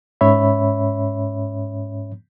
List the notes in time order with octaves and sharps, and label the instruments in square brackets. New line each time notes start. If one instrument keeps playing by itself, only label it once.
[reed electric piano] G#2 C#4 C#5 E5 B5